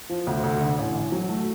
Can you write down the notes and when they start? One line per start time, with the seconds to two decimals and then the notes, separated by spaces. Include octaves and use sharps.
0.10 F3
0.27 D2
0.44 D2
0.61 D3
0.78 A1
0.95 A1
1.12 F#3
1.29 A3